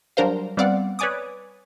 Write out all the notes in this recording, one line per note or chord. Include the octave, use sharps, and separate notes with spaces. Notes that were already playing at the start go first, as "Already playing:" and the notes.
F#3 G3 D4 A#4 C5 F5
G3 B3 C4 D5 F5 F#5
B4 C#5 D5 G#5 D6 D#6